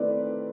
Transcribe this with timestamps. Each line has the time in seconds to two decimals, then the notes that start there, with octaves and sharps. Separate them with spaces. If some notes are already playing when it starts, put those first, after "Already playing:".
Already playing: D#3 A3 C4 E4 B4 D5